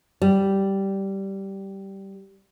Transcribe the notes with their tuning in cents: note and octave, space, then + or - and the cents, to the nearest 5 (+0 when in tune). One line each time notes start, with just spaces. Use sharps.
G3 -10